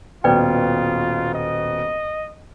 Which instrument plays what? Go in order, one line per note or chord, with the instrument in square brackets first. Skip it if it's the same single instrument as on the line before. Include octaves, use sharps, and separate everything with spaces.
[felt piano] D#1 B2 [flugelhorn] F4 [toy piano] B4 D5 G5
[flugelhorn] D#5